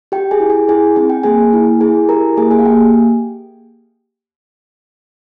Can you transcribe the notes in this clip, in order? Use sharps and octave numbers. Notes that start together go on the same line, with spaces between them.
G4 G5
G#4 G#5
E4
G#4 G#5
E4 G#4 G#5
C4 G#5
G5
A#3 G#4 G#5
E4
E4 G#4 G#5
G4 A#4 A#5
A#3 G#4 G#5
G#4 G#5
F5
A#3 G4 G5